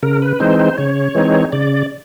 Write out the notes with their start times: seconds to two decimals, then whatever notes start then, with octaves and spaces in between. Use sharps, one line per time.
0.03 C#3 A#4
0.22 B4
0.40 E3 G#3 C4 D#4 C5
0.59 C5
0.78 C#3 C#5
1.15 E3 G#3 C4 D#4
1.52 C#3 D5